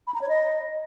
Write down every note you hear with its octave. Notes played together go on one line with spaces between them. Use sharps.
B5
A#5
C#5
D#5